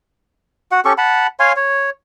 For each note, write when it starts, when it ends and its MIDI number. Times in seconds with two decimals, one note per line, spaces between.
0.72 0.80 66
0.72 0.80 78
0.85 0.93 61
0.85 0.93 67
0.85 0.93 69
0.85 0.93 85
0.98 1.27 78
0.98 1.27 81
0.98 1.27 83
1.40 1.52 73
1.40 1.52 77
1.40 1.52 80
1.40 1.52 84
1.56 1.90 73